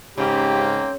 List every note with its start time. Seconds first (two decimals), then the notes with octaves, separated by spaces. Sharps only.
0.18 G#2 C#3 A#3 C4 G4 G5